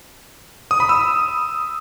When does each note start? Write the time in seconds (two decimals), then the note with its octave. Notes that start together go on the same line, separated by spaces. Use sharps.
0.71 D#6
0.80 B5
0.89 E6